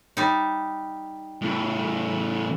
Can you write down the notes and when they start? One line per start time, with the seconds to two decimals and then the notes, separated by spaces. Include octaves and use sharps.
0.17 G3 D#4
1.42 A2 C#3